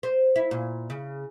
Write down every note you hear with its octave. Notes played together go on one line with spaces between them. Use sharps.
C5
E4
A#2
C#3